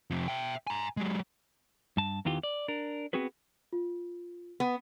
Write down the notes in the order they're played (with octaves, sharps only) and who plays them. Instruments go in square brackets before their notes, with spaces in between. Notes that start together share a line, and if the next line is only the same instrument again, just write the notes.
[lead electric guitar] F2 C3
E5 G5
G#5 A#5
F#3 G#3
[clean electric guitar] G2 A5
E2 D#3 E3 F4 G4
D5
D4 A#4
B3 C4 F#4 G#4 B4
[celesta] F4
[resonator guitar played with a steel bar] B3